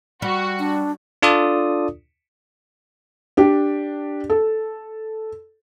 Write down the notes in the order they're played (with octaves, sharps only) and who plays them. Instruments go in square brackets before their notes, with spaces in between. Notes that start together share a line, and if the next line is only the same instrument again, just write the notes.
[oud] G3 [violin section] F#4
[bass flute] D4
[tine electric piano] D4 F4 A4 D5 D#6
[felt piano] D4 G4
A4